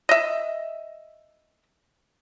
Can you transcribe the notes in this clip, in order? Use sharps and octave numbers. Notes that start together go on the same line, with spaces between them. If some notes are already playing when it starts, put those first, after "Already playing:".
D#5 E5